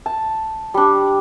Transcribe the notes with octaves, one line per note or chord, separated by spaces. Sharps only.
A5
G3 D4